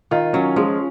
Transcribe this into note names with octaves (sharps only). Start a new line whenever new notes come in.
D#3 F4
F#3 C#4
F3 G#3